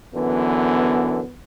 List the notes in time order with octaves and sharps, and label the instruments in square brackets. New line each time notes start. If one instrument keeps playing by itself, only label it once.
[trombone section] F#2 D3 E3 [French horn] B3